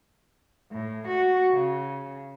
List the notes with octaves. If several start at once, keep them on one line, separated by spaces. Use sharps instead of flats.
A2
F#4
C#3